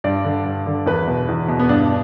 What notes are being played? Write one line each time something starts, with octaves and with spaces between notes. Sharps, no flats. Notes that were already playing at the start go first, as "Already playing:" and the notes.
G2 D5
D3
G2
D3
E2 B4
B2
E2
B2
B3
G2 D4